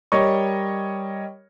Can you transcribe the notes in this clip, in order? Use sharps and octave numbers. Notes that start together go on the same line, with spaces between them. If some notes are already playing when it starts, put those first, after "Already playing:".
G3 A#4 C#5 D#5 C#6